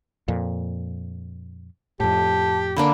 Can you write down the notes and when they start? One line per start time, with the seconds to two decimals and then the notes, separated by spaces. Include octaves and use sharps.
0.28 F2 A#2
2.00 F2 A2 G4 A5
2.76 D3 A#3 D4 B5